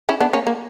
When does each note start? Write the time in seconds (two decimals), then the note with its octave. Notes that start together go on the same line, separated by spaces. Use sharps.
0.09 C#4 E4
0.20 B3 D4
0.33 A#3 C#4
0.47 A#3